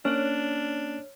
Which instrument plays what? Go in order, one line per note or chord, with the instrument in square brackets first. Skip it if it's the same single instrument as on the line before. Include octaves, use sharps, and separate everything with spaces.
[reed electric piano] A#3 C#4 [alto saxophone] D4 [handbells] C#5 F6